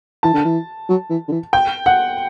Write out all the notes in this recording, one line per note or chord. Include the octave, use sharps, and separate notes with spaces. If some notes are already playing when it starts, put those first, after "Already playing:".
E3 A5
D3
E3
F#3
E3
D3
E3
G5
F#5